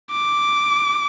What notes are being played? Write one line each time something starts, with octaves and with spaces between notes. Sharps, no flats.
D6